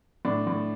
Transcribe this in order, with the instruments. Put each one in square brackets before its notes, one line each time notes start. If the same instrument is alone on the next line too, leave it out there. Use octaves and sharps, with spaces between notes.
[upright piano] A2 [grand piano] D4
[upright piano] A2